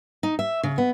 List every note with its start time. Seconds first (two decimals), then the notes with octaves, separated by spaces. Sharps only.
0.23 D#4
0.39 E5
0.63 C#3
0.78 B3